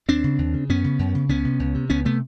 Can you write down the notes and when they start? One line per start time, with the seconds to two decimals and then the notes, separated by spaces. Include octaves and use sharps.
0.08 D#2 C4 D4
0.24 C#3
0.38 D#2
0.54 C#3
0.69 F#2 B3 C#4
0.84 C#3
0.99 F#2
1.15 C#3
1.29 C#2 B3 C#4
1.45 C3
1.59 C#2
1.75 C3
1.90 C#2 B3 C#4
2.05 C3 A3 B3